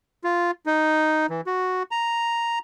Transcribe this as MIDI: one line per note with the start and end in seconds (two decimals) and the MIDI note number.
0.24 0.51 65
0.66 1.26 63
1.30 1.41 52
1.46 1.83 66
1.91 2.59 82